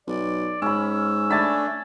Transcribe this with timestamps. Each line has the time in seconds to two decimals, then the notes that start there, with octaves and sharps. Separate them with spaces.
0.07 B1 D5
0.62 G#2 C#4 B5 E6
1.30 A3 D4 G#5 A5 B5